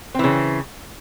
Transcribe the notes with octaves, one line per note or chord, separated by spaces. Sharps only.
C#3 E3 C4